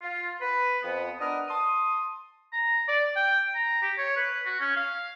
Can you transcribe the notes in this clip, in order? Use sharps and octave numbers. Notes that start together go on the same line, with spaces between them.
F4
B4
F2 B3
B3 D4 A#4 D#5
A5 C6 D#6
A#5
D5
G5
A#5
G4
C#5
B4
F#4
C#4
F5